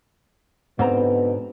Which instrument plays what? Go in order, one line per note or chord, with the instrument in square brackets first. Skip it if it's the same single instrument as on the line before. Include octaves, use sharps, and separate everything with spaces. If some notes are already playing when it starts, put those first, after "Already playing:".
[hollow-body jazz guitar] G#2 C4 A#5 [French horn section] B2 D3 B3